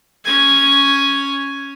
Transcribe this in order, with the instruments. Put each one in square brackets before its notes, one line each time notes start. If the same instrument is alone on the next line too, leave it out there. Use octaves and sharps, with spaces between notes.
[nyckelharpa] C#4 G#5